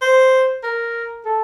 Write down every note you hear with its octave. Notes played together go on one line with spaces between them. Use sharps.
C5
A#4
A4